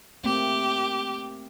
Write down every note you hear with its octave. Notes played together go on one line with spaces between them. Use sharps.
A3 A#3 C4 G4